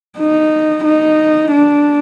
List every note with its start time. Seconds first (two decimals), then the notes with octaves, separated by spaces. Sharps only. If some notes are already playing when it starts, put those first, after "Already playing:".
0.19 D#4
0.85 D#4
1.52 D4